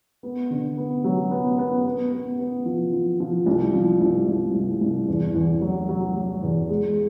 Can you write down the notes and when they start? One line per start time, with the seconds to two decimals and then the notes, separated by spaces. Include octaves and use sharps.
0.23 B3
0.51 D3
0.77 B3
1.04 F#3
1.31 B3
1.58 B3
1.85 B3
2.12 B3
2.39 B3
2.66 F3
2.93 F3
3.20 F3
3.46 C2
3.74 F3
4.00 C2
4.27 C2
4.55 C2
4.81 C2
5.08 E2
5.35 E2
5.61 F#3
5.89 F#3
6.15 F#3
6.42 E2
6.69 G#3